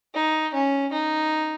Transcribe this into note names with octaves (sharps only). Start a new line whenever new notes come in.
D#4
C#4
D#4